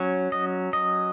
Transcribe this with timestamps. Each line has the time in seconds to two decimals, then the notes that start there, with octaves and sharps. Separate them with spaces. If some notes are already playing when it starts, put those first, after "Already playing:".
Already playing: F#3 C#4
0.32 D#5
0.73 D#5